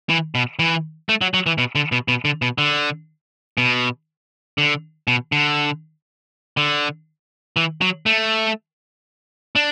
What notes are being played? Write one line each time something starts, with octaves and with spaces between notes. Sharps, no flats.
E3
B2
E3
A3
F#3
F#3
E3
B2
D3
B2
B2
D3
B2
D3
B2
D3
B2
D3
D3
E3
F#3
A3
D4